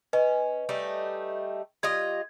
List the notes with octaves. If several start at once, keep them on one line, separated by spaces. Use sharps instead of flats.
C#4 B4 D#5 G#5
G3 A3 D#4
G3 F4 D#5 G#6